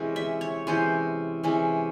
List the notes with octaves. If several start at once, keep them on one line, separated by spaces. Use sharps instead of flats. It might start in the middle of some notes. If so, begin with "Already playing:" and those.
Already playing: C3 E3 G#3 C#4
E5
C#5
C3 E3 G#3 C#4 C5
C3 E3 G#3 C#4